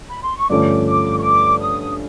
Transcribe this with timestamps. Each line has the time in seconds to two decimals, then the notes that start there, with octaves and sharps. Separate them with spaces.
0.09 B5
0.23 C6
0.37 C#6
0.50 G2 D3 F3 A3 C#4 D6
0.87 D6
1.19 C#6
1.23 D6
1.60 D#6